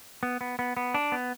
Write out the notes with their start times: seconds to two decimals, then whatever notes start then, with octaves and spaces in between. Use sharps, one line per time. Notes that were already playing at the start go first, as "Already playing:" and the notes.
0.23 B3
0.41 B3
0.59 B3
0.77 B3
0.94 D4
1.12 B3